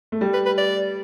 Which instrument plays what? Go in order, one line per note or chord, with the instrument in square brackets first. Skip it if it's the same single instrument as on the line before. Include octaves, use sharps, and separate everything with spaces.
[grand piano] A3
G3
[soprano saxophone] B4
B4
D5